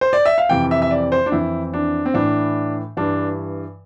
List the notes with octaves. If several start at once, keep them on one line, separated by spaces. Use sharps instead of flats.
C5
D5
E5
F5
F2 C3 E3 G5
E5
E5
D5
C5
D4
F2 E3 E4
D4
C4
A2 E3 D4
G2 E3 D4